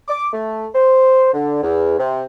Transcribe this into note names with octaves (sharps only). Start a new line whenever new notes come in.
D6
A3
C5
D3
E2
C3